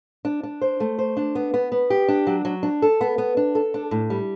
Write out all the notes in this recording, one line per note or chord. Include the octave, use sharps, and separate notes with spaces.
D4
D4
C5
A3
C5
D4
B3
B3
B3
G4
D4
F#3
F#3
D4
A4
B3
B3
D4
A4
D4
A2
G3